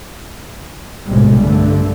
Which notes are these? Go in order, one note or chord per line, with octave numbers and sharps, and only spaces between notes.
B1 A2 C3 G3 G#3
G2 D3 A3